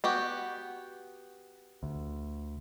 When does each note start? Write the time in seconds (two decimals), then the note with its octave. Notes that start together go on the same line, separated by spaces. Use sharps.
0.04 B3 F#4 G4
1.83 D2